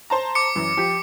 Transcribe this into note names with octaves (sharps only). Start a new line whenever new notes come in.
C5 A5 A#5
D6 C#7
F#2 E3
F3 G4